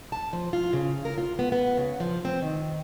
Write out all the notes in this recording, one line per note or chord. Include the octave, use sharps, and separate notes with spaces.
A5
F3
F4
C#3
A#4
F4
B3
B3
C#3
F3
C4
D#3